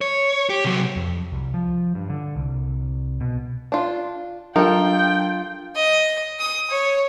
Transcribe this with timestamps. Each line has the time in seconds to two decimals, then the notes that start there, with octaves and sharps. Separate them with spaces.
0.01 C#5
0.49 G4
0.64 C3 F#3
0.96 F2
1.32 C2
1.54 F3
1.95 G2
2.10 D3
2.36 C2
3.20 B2
3.72 D4 F4
4.56 F#3 D4 F4 A4 A#4 G5
5.75 D#5
6.40 D#6
6.70 C#5